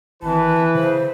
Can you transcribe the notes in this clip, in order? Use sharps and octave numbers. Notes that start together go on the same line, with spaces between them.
G#1 E3 E4 B4 A5
C#3 C5